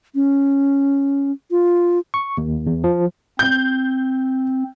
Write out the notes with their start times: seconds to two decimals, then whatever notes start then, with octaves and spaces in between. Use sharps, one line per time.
0.15 C#4
1.51 F4
2.14 C#6
2.37 D#2
2.67 E2
2.84 F3
3.39 C4 G6